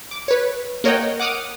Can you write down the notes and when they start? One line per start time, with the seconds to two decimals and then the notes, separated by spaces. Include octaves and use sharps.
0.11 D6
0.28 B4 C#5
0.84 A#3 A#4 C#5 D#5 F#5 G5
1.19 F#5 D6 D#6 F6